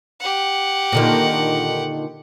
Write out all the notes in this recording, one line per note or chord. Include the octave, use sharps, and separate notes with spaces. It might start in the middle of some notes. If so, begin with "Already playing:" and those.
G4 F#5
A#2 D3 D#3